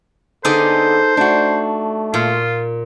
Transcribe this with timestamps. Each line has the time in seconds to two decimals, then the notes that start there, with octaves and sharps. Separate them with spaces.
0.45 D3 B3 D#4 G#4 A4 C5 D5
1.17 A3 D4 F#4
2.14 A#2 F4